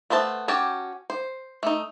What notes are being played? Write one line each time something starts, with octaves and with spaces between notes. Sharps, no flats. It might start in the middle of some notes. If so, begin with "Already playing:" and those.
A3 B3 C5 A5
C#4 F#4 G4 G5 A5
C5
A3 D#4